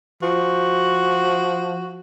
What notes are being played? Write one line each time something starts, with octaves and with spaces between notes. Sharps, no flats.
F3 F#4